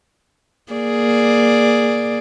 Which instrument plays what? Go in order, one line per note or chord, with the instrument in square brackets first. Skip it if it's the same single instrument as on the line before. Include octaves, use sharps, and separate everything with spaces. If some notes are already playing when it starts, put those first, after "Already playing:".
[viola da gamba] A#3 G#4 D5